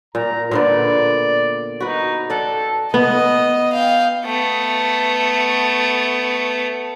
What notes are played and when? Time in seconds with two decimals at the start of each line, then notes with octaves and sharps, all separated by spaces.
0.15 A#2 A#5
0.51 A#2 D3 B3 D5
1.80 D#4 F#4 B4
2.30 A4 D5 F#5
2.94 B3 D#5
3.73 F5 G5
4.25 A3 B3